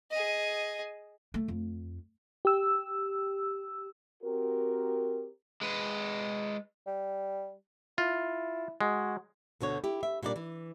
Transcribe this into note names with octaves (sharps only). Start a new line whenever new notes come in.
G#4 D#5
A3
F2
G4 E6
C4 F#4 G4 A#4
G#3 B4
G3
E4 F4
G#3 F#4
D2 B2 D3 C#5
E4 G4
E5
A#2 G3 D4 A#4 D5
E3